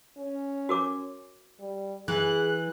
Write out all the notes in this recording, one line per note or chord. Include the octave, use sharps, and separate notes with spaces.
C#4
F#4 A#4 D6
G3
E3 G#4 F#6